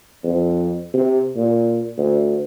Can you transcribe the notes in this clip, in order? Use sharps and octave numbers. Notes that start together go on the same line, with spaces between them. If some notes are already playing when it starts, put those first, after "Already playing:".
F2
C3
A#2
D2